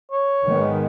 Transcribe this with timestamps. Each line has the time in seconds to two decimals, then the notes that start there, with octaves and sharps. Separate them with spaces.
0.12 C#5
0.45 G#2 D#3 G#3 B3